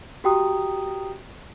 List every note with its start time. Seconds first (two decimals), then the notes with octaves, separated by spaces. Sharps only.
0.24 F#4 G4 G5 A#5 D#6